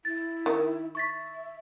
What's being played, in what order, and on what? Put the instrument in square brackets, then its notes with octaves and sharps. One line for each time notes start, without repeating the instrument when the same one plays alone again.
[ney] E4 [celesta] A6
[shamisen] D#3
[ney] E5 [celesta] C#6 A6 B6